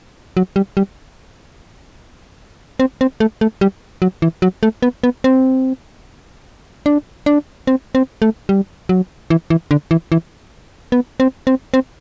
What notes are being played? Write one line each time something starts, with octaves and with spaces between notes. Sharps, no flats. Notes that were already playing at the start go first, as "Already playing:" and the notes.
F#3
G3
G3
C4
C4
A3
A3
G3
F#3
E3
F#3
A3
B3
B3
C4
D4
D4
C4
C4
A3
G3
F#3
E3
E3
D3
E3
E3
B3
C4
C4
C4